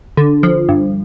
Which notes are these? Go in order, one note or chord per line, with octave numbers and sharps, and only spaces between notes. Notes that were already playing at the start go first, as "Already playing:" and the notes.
D3
F3
G2